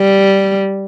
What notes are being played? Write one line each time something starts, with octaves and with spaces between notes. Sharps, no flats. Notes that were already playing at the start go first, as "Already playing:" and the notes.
Already playing: G3